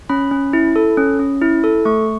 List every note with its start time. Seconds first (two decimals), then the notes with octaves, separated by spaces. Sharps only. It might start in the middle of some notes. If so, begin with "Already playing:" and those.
0.10 C#4 B5
0.31 C#4
0.53 E4
0.76 A4
0.97 C#4
1.19 C#4
1.42 E4
1.64 A4
1.85 A3 C#6